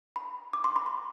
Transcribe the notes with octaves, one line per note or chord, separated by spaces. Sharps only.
B5
D6
C6
B5
C6